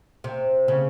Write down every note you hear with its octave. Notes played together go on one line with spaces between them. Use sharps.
C3
C#3